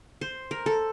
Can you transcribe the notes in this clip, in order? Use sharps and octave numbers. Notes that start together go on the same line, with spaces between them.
C5
A#4
A4